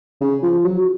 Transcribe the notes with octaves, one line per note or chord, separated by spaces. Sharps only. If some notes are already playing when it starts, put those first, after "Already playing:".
C#3
F3
F#3